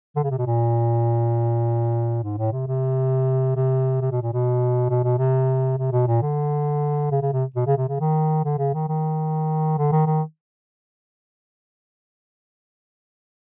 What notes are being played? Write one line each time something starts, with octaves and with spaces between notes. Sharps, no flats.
D3
C#3
C3
B2
A#2
G#2
A2
C3
C3
C3
C3
B2
A#2
B2
B2
B2
C3
C3
B2
A#2
D3
C#3
C#3
C3
B2
C#3
C3
C#3
D#3
D3
C#3
D#3
D#3
D3
D#3
D#3